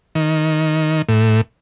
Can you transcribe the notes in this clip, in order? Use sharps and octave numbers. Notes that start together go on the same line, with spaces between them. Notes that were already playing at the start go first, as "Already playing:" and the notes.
D#3
A2